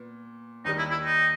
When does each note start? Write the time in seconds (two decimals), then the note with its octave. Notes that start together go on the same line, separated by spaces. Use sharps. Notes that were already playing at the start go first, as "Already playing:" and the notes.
Already playing: A#2 B3
0.65 D#2 D#3 G3 D#4
0.78 E4
0.91 E4
1.04 D#4